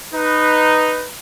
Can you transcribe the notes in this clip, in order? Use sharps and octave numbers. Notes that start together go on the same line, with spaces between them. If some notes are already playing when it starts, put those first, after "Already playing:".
D#4 B4